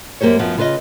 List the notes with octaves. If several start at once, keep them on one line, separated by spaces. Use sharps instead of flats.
F#2 A#3 G4 C5 C#5
F#2 F3 F#3 B3
C#3 F4 B4 C5 D#5